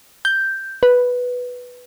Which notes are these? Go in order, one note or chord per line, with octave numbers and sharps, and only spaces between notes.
G6
B4